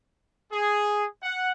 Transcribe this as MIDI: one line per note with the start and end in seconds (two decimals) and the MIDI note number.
0.51 1.05 68
1.23 1.51 78